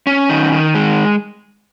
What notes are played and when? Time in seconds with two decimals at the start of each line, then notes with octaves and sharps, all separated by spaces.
0.07 C#4
0.29 D#3
0.52 D#3
0.75 G#3